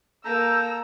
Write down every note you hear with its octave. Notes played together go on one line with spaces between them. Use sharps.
A#3 A4 A#5 E6 G6